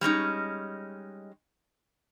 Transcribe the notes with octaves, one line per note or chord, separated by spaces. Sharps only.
G3 G#3 C#4 D#4